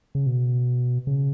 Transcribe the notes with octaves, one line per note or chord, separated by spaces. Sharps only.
C#3
B2
C#3